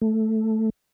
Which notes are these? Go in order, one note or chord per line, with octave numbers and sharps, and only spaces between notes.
A3